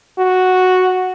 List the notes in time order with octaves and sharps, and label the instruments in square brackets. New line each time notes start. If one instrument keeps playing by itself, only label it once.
[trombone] F#4